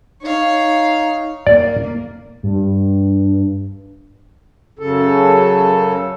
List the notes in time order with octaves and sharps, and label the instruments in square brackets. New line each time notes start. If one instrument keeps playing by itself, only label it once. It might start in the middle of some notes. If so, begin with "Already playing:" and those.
[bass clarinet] D#4 [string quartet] C#5 F5
[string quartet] A#3 [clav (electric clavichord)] D5
[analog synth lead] G2
[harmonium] F#2 C#3 A4